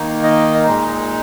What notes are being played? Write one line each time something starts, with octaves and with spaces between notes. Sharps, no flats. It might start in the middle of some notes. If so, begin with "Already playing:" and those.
Already playing: D#3 A#3 D#4
D#5
A#2 G#3 D#4